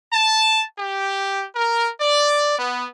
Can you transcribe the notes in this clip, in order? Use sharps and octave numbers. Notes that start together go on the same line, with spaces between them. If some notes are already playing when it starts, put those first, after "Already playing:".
A5
G4
A#4
D5
B3